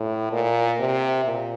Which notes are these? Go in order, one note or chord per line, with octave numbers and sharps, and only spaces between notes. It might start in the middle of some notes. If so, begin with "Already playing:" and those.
Already playing: A2
A#2
C3
A#2